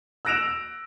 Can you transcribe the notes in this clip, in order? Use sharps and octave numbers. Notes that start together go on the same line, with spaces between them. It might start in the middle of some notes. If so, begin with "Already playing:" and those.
E6 F#6 A#6 D7 E7 F7